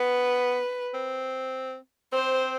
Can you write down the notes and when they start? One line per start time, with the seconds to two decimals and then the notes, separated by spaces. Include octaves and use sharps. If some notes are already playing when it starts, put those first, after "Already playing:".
Already playing: B3 B4
0.94 C4
2.13 C4 C5